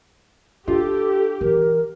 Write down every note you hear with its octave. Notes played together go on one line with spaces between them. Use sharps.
D4 F4 G4 A4
E3 A#4